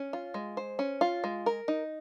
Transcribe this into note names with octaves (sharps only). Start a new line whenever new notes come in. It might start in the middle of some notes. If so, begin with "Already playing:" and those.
Already playing: C#4
F4
G#3
C5
C#4
F4
G#3
A#4
D#4